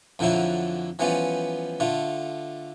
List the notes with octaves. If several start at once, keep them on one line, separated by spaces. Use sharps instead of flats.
F2 D3 F3 F#3 E4 F4
E3 F3 G3 B3 C#4 F4
D3 A3 F4